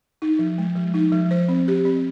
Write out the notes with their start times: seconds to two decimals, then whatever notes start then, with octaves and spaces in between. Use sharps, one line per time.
0.22 D#4
0.39 F3
0.58 G#3
0.75 F3
0.94 D#4
1.12 F3
1.31 C5
1.48 C4
1.68 G4
1.85 C4